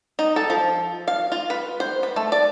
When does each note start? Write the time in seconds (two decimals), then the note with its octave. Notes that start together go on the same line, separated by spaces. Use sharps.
0.19 D#4
0.36 A4
0.50 F3
1.08 F5
1.32 F4
1.50 B4
1.80 C5
2.03 B4
2.16 A3
2.32 D5